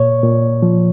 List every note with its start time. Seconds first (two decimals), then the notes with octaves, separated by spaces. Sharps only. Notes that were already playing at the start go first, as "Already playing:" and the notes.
Already playing: A#2 C#5
0.23 A#2
0.63 F3